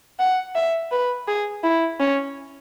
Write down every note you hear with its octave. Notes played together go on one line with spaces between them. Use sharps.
F#5
E5
B4
G#4
E4
C#4